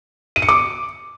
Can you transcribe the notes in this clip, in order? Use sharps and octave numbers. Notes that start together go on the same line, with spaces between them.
D#7
C#7
D6